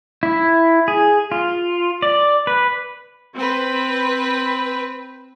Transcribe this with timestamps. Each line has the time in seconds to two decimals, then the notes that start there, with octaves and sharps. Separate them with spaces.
0.23 E4
0.88 G#4
1.32 F4
2.02 D5
2.47 B4
3.35 C4 B4